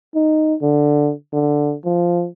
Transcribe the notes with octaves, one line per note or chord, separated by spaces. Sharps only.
D#4
D3
D3
F3